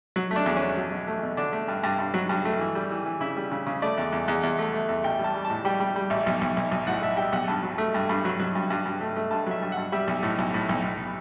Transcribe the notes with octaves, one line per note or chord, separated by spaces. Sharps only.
F#3
A3
D4
E2
C#4
E2
F#3
B2
A3
B2
D3 D4
A3
G2
G2
G2
F#3
G2
A3
E3
G3
E3
E3
C#3 E4
G3
C#3
C#3
A3 D5
E2
E2
E2
E2
A3
A3
E2
A1 G5
G3 A5
G3
A5
A2
G3 G5
G3
G3
A1
B1
B1
B1
B1
A2 F#5
A2 E5
G3 G5
B1 F#5
G2 A5
F#3
A3
G2
G2
F#3
F#3
G2
G2
G2
A3
A3
G2 A5
F#3 E5
G2
F#5
G2
G3 E5
B1
A2
B1
A2
B1
B1